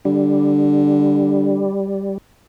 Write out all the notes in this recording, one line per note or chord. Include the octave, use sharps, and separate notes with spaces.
D3 G3